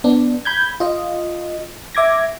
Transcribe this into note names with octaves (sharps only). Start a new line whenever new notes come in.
B3 D4
B5 G6 G#6
F4 D#5
E5 D6 G#6 A#6